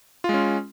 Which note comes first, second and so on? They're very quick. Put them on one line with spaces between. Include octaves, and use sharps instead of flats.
F4 G#3 C#4